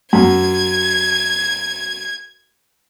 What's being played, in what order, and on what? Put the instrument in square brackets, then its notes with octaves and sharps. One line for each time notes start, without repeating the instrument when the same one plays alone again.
[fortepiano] F#2 [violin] G#6